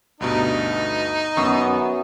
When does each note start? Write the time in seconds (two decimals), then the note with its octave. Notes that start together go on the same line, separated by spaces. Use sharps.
0.20 D2 G2 B2 D#4
1.37 F#2 B3 C#6 D#6